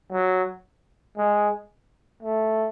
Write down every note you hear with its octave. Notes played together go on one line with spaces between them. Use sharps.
F#3
G#3
A3